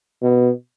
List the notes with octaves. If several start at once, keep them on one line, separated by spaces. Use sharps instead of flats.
B2